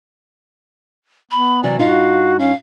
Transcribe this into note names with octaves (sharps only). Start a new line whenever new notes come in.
B3 B5
C3 E3 F#3 D5
G2 D#4 F4 F#4 F5
C#4 F5